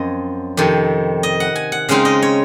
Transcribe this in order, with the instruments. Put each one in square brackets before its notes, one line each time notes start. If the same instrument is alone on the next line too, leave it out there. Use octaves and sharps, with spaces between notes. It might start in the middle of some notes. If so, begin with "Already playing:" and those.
Already playing: [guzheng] F#2 F3 C4 C#5 D#5
F2 C3 D#3
D#5
F#5
G#5
F#5
C#3 G#3 C4 D#4 F5
D#5
C#5